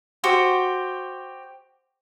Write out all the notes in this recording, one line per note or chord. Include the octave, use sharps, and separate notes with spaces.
F#4 G4 C5